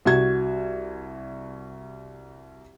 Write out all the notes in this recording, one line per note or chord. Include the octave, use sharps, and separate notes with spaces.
C2 F#4 G#6